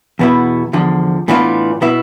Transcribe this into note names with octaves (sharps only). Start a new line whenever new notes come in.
E2 B2 B3 E4
E2 D3 F3
A2 E3 B3 D4 F4
B2 B3 E4